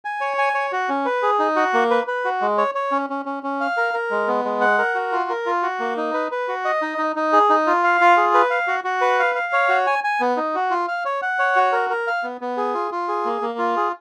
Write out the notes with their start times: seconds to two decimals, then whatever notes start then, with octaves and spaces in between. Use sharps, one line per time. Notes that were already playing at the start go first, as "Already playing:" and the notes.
0.05 G#5
0.21 C#5
0.38 G#5
0.55 C#5
0.72 F#4
0.89 C#4
1.05 B4
1.23 G#4
1.39 D#4
1.56 F#4
1.74 A#3
1.91 B4
2.07 B4
2.25 F#4
2.41 G#3
2.58 C#5
2.75 C#5
2.92 C#4
3.10 C#4
3.25 C#4
3.43 C#4
3.61 F5
3.77 A#4
3.94 A#4
4.11 G#3
4.28 B3
4.45 G#3
4.61 F#5
4.78 A#4
4.95 F#4
5.12 F4
5.30 A#4
5.46 F4
5.63 F#4
5.80 A#3
5.97 D#4
6.13 B4
6.32 B4
6.48 F#4
6.65 D#5
6.82 D#4
6.98 D#4
7.16 D#4
7.33 G#4
7.50 D#4
7.67 F4
7.84 F5
8.01 F4
8.17 G#4
8.34 B4
8.50 F5
8.67 F#4
8.84 F#4
9.01 B4
9.19 F5
9.35 F5
9.53 C#5
9.69 F#4
9.87 G#5
10.04 G#5
10.20 B3
10.37 D#4
10.55 F#4
10.71 F4
10.88 F5
11.05 C#5
11.22 F#5
11.39 C#5
11.56 F#4
11.72 A#4
11.90 A#4
12.07 F5
12.23 B3
12.41 B3
12.57 G#4
12.74 F4
12.92 F4
13.08 G#4
13.25 A#3
13.42 A#3
13.58 F4
13.76 G#4